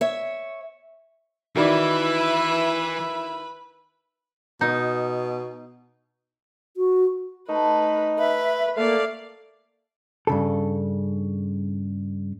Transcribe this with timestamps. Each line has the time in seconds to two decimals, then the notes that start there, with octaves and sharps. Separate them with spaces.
0.01 C#5 E5
1.56 D#3 E3 E4 F#4 B4 D5 E5 B5
4.61 B2 D#4
6.77 F#4
7.49 A3 D#4 B4
8.19 B4 E5
8.77 A3 A#3 D5 F5
10.27 G2 C#3 A4